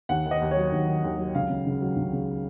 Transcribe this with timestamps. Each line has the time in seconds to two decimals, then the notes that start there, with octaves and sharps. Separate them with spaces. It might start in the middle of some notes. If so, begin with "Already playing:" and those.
0.09 D#2 F#5
0.25 D#3
0.31 D#5
0.41 D#2
0.51 C#5
0.57 F#3
0.72 D#2
0.88 D#3
1.04 D#2
1.18 F#3
1.35 C#2 F5
1.49 C#3
1.66 C#2
1.82 F#3
1.96 C#2
2.13 C#3